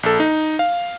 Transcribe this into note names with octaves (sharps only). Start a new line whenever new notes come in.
A#1 A4
D#4
F5